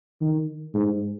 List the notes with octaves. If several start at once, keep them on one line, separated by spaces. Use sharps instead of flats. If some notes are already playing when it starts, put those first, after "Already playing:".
D#3
G#2